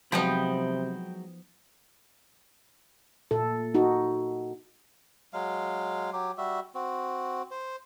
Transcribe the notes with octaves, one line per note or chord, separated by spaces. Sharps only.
C3 F3 F#3 G#3 B3 D#4 G5 B5
A#2 A4
D#4 F#4
F#3 G#3 F5
F#3 G4
G3 F#4 E5
C4 F#4
C5